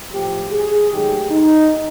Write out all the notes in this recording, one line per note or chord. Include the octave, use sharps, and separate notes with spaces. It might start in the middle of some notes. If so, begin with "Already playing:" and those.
A2 F3 A3 G4
G#4
G#2 D#3 F#3 A3 G4
D#4